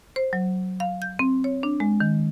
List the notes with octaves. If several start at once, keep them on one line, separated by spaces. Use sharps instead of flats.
C5
F#3
F5
G6
C4
C#5
D4
G#3
D#3